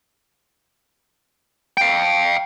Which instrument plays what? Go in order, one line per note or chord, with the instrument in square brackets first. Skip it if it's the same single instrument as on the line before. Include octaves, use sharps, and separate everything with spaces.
[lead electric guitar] F5 G5